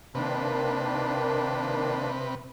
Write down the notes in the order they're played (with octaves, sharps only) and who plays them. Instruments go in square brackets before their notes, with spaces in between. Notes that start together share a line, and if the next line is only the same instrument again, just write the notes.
[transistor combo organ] C3 B4 [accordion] D#3 A#3 D4